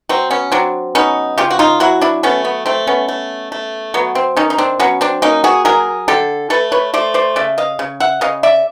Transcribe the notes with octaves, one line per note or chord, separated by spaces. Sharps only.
F#3 C4
B3 C#4
F#3 C4 D4
B3 C#4 D#4
C#3 F4 G4
F#4
D#4 F4
F#3 E4 F#4
D4 E4
A3 B3 C#4
B3
A3 C4
B3 C#4
A3
A3
F#3 B3
C4
D#3 C#4 D#4
D#4
C4 D4
F#3 B3 C#4
C4 D4
A#3 C#4 D#4
F#4 G#4
F#3 G#4 A#4
D3 G4 A4
A3 A4 B4
B4 C#5
A3 C5 D5
C5 D5
C#3 D5 E5
D#5 F5
C#3
E5 F#5
C#3 D#5 F5
D5 E5